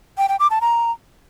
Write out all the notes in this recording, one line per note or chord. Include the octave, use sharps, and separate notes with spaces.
G5
G5
D6
A5
A#5